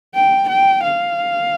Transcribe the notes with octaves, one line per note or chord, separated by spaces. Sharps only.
G5
G5
F5